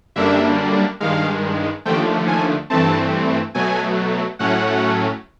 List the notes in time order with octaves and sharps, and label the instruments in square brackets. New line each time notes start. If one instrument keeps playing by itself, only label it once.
[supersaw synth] F#2 D3 G3 A#3 D4 E5
G2 D#3 G#3 F5
D#2 D3 F3 A3 G5
G#5
G2 E3 A3 C4 A5
B2 F#3 A3 G#5
A2 F#3 A3 C#4 F#5